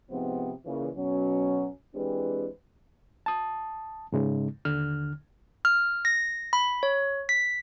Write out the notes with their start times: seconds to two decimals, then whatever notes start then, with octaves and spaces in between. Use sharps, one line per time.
0.11 G#2 C3 F3 B3 C4
0.65 A#2 C#3 E3
0.96 B2 F#3 C#4
1.95 E3 G#3 C4 D4 G4 B4
3.26 A5 D#6
4.12 G#2 C#3 G#3 D#4
4.65 D#2 D3 F6
5.65 F6
6.05 A#6
6.53 B5
6.83 C#5
7.29 B6